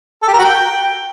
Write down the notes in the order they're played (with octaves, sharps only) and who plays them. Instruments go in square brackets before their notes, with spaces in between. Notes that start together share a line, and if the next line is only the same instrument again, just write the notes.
[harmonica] A4
G4
A#4
F#4
G5